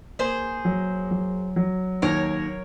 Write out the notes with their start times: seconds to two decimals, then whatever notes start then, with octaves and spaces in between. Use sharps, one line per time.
0.19 A#3 G#4 C5
0.65 F#3
1.11 F#3
1.56 F#3
2.02 D#2 A#4 C#5